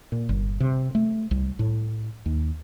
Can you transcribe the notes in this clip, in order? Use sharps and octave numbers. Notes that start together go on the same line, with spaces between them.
A#2
G1
C3
A3
C2
A2
D#2